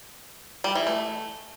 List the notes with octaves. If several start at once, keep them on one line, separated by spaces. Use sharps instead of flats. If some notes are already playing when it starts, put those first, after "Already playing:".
G3
E3
A3